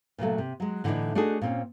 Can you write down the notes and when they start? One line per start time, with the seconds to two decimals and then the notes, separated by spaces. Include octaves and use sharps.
0.18 A#2 C#3 F#3 A3
0.38 C3
0.60 F#3 G#3
0.84 A2 D3 E3 G#3 D4 D#4
1.15 A3 D4 D#4 F#4 G#4
1.41 A#2 C4 C#4